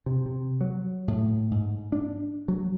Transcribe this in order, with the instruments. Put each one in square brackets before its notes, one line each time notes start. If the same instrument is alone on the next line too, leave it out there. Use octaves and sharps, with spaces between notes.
[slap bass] C3
C3
F#3
A2
G#2
D4
F#3